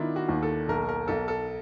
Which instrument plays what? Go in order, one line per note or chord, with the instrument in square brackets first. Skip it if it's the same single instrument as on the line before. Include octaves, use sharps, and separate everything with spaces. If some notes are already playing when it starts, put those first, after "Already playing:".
Already playing: [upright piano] D#3 B3 [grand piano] D4 E4 F4
[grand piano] F#4
[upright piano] D#2
[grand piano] A4
[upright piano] B1 [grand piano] A#4
[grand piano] A#4
[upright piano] B1 [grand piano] A4
[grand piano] A4